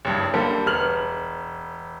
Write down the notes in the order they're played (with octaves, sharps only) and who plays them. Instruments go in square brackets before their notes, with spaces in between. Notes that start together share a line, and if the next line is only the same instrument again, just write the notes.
[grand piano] F#1 G2
D3 G3 A#3 A4
E1 B3 F6 F#7